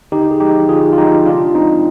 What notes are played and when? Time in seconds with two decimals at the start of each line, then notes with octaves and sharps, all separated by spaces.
0.12 D3 D#4 G4
0.31 G#4
0.40 F3 G#3 D#4 G4
0.69 D3 F4 G#4
0.93 F4
0.98 F3 G#3 D#4 G4
1.26 C3 D4 F4
1.55 F3 G#3 C4 D#4